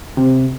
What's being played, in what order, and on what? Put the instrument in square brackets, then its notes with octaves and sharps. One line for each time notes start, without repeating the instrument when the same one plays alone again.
[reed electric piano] C3